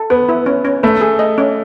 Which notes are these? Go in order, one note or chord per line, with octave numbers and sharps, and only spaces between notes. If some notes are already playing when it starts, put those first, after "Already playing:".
Already playing: A4
B3 B4
E4
C#4
C#4
A3 B4
G#4
D#5
C#4